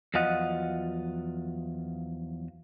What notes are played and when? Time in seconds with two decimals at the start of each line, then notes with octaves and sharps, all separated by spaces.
0.14 E2 F3 F#3 F4 D#5 F#5